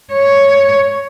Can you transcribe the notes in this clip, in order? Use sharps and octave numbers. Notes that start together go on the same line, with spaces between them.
C#5